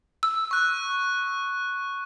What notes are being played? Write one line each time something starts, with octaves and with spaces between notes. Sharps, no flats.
E6
C#6 F#6